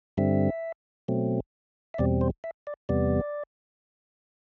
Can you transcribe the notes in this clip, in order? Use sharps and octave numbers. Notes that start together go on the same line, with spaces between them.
G2 D3 G3 C4 E5
B2 F#3 A3 C4
E5
E2 B2 G3 C4 D5
C5
E5
D5
E2 C3 G3 B3 D5